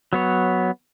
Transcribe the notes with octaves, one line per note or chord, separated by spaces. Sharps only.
F#3 B3 C#5